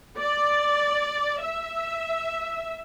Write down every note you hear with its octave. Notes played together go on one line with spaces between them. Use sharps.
D5
E5